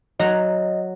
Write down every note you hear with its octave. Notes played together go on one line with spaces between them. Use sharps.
F#3 D#5 A#5